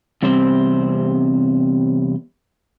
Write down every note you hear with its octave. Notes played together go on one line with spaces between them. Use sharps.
E2 C3 G3 C4 C5